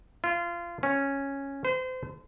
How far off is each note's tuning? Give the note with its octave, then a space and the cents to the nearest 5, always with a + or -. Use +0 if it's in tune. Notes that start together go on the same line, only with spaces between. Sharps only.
F4 -25
C#4 -5
C5 -35